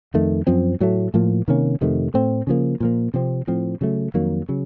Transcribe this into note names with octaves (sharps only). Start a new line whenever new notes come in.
F2 D#3 A3
F#2 F3 C4
A2 F#3 A3
A2 F3 A#3
C3 D#3 A#3 C#4
F2 C3 D#3 A3
A2 A3 C4
C#3 F3 A#3
A#2 F3 A#3
C3 F3 C4
A2 F3 C4
C#3 F#3 A3
F2 D#3 F#3 A#3
C#3 F#3